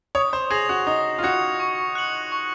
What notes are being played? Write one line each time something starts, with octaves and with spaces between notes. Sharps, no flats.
C#5 D#6
C5
G#4 A#6 F7
F#4
D#4 D#6
F4
F#4 G#6 C#7 F7
C#6
F#6 C#7 F#7
C#6